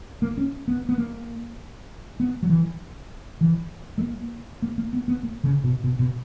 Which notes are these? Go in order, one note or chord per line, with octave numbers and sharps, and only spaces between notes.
A#3
C#4
B3
B3
A#3
B3
F#3
E3
E3
G#3
A#3
A#3
A#3
B3
B3
A#3
C#3
B2
B2
B2